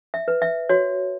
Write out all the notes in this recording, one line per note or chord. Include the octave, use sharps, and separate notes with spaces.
E5
B4
E5
F#4 C#5